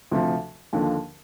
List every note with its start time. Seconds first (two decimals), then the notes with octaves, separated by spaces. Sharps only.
0.11 D2 C3 F3
0.73 D#2 D3 F3